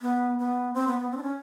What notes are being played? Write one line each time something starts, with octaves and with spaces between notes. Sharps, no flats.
B3
B3
C4
B3
B3
C4
D4
C#4